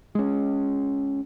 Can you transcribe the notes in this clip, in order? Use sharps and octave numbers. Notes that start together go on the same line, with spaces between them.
G#3 C#4